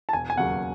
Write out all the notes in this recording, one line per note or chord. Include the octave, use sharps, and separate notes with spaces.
A5
E1 G#5
G#5
D#2 C#3 F#3 F#5